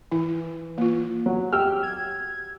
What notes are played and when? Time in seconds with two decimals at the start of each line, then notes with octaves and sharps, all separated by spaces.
0.12 E3 E4
0.78 A#3 F4
1.26 F#3
1.53 G4 G5 E6 F6
1.83 G#6